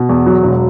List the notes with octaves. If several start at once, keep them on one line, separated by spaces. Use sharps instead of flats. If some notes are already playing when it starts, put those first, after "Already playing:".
Already playing: B2
E2
F#3
E1